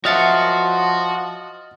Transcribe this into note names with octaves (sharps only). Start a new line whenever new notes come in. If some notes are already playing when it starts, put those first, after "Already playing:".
F3 F#4 C#5 D#5 E5 F#5 F6 A6